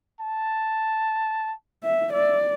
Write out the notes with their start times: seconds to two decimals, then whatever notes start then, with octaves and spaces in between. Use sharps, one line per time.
0.20 A5
1.84 E5
2.13 D5 E5